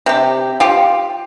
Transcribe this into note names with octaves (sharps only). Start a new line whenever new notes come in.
C3 G4
F4 G4